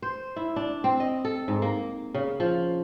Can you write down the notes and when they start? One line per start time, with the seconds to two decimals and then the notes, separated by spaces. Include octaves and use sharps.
0.02 C5
0.36 E4
0.56 D4
0.84 C4
1.00 D#5
1.25 A4
1.48 G#2
1.62 A#3
2.15 C#3
2.40 F3